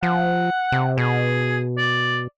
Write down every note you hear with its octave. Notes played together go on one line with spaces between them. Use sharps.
F3 F#5
C3
B2 G#4
D5